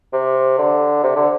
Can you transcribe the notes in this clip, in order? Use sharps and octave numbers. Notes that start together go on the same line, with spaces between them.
C3
D3
C3
D3